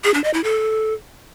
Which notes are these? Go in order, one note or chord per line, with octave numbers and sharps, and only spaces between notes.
G#4
D4
D#5
E4
A4